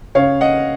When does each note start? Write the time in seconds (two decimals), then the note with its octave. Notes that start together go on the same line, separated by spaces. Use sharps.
0.15 C#3 C#5 F5
0.41 D#5 F#5